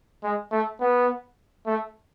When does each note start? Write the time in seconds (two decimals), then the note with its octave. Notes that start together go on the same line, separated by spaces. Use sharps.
0.23 G#3
0.52 A3
0.81 B3
1.66 A3